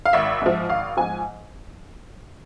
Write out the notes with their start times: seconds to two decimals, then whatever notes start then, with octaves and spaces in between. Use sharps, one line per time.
0.05 F5
0.13 G#1 E5
0.42 G#2 F3
0.69 G#1 F5
0.97 G#2 F3 G#5